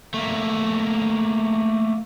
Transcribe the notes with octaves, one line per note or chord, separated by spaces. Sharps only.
A3 A#3